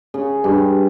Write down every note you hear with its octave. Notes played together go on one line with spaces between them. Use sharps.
C#3
G2